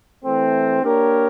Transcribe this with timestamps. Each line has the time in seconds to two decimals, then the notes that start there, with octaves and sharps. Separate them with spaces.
0.24 E3 A3 C4
0.82 A#3 D4 G4 A#4 C#5